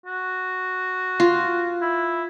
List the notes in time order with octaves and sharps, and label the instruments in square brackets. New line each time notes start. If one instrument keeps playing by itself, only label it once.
[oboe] F#4
[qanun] F4
[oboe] E4